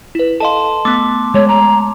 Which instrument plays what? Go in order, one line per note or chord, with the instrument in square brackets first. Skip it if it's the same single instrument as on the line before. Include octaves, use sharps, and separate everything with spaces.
[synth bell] E4 B4
[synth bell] A4 D#5 F5 [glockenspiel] A5 C6
[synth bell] A3 B3 [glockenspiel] D6
[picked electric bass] G#3 [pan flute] C#5
[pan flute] A#5